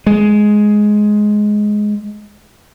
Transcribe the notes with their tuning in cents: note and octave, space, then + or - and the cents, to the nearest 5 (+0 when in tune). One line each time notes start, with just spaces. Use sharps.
G#3 +10